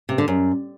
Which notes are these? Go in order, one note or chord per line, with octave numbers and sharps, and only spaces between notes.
C3
D3
F#2